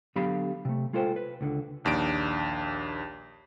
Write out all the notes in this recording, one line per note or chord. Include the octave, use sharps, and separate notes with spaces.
D3 F#3 B3 G4 F5 B5
C3 A3
G#3 F4 A4 C5 G5
B4
C#2 D3
A#1 D#2 D4 D7